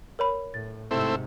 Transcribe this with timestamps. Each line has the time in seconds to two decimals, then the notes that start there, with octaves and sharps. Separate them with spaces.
0.19 A#4 C#5 B5
0.54 A2 A6
0.91 G#2 C3 A3 C4 E4